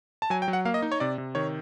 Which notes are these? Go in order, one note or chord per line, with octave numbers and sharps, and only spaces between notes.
A5
F#3 G#5
G5
F#3
F#5
A#3 F5
D#5
D#4
C#5
C3 D5
C3
D#3 C#5